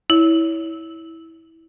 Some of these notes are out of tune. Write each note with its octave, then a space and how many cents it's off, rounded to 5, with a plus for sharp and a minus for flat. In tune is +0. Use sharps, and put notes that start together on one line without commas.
E4 -15 C#5 +30